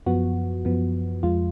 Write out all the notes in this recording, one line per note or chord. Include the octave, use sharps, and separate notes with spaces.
F#2 F3 B3 F#4
F#2 F3 B3
F2 F3 G#3 F4